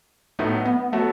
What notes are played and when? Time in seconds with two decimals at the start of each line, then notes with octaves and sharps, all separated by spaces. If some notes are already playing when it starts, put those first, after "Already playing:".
0.39 A2 F#3 A3 B3 D#4
0.66 B3
0.92 F#3 A3 B3 F#4 A4